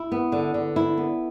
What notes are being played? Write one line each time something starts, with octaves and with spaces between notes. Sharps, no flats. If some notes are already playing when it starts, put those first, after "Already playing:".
Already playing: E4
B3
D3
D3
E4
B3